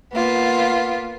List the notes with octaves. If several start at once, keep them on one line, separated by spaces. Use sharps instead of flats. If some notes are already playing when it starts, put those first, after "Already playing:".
A#3 B3 F4